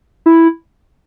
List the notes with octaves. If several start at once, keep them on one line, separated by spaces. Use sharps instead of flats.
E4